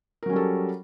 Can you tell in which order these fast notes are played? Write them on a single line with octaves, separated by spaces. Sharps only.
A#4 F#3 C#4 G3 A4